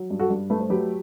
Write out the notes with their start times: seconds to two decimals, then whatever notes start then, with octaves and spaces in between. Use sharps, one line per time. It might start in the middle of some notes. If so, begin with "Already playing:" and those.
Already playing: F#3
0.10 G2
0.20 F#4 A4
0.30 G2
0.50 A3 B4
0.60 C5
0.70 F#3 G4 B4